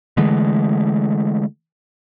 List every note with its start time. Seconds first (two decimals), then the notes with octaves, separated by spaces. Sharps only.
0.17 D3 E3 G#3 A3